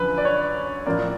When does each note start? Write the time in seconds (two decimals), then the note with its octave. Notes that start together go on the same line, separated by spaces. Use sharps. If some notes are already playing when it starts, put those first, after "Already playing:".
Already playing: F#2 D3 F3 B4
0.18 D5
0.25 C#5
0.86 A2 F3 A#3 D5